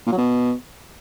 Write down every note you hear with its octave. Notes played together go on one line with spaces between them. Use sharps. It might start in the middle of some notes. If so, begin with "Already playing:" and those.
A#2
F#3
B2